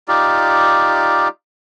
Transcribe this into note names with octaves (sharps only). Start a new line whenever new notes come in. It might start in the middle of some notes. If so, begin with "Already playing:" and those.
D#4 F4 G4 D5